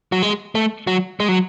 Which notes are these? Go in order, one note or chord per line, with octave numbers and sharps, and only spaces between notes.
F#3
G#3
A3
F#3
G#3
F#3